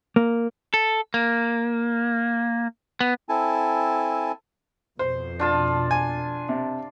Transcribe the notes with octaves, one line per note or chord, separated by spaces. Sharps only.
A#3
A4
A#3
B3
C4 E4 A4 G#5 A5
F2 B2 C5
D4 F4 A5
G#5
C3